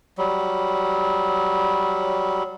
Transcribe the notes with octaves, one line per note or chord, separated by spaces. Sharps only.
F#3 G3